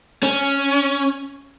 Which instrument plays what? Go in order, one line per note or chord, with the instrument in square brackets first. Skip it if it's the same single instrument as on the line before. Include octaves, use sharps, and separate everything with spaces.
[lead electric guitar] C#4